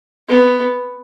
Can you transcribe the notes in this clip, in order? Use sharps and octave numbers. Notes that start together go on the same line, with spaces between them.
B3